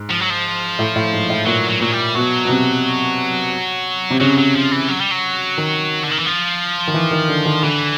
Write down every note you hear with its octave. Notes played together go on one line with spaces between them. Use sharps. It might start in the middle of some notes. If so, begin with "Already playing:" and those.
Already playing: G#2
F3
F#3
F3
A2
A2
G#2
A2
A#2 F#3
F#3
A#2 F#3
G3
B2 F#3
B2
C3
C3
C#3 F#3
F#3
F3
E3
F#3
G3
F#3
D#3
D3
D#3
E3
F3
D#3
E3
D#3
D3
D#3
D3 E3